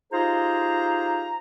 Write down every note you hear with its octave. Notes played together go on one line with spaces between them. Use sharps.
D#4 F4 G4 G#4 C5 A#5